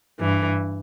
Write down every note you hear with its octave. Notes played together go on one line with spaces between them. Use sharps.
G2 E3